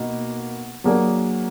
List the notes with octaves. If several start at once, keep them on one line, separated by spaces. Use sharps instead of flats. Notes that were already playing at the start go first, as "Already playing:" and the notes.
Already playing: B2 A#3 D#4 F#4
F#3 A#3 D4 G#4